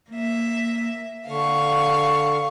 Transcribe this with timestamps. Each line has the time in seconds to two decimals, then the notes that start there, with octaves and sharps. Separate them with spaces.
0.10 A#3 E5
1.28 D3 F5 C#6